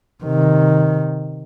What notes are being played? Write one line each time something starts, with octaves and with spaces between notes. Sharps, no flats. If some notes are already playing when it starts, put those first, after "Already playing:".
C3 D#3